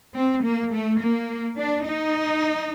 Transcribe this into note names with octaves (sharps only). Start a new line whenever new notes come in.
C4
A#3
A3
A#3
D4
D#4